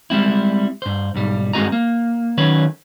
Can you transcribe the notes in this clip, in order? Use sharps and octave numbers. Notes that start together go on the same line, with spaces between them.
G3 G#3 C4 E4
G2 C5
B1 G#2 G3
G2 G#3 C4 F#4 D#5 A#5
A#3
D#3 F#3 C#4 B4 C#5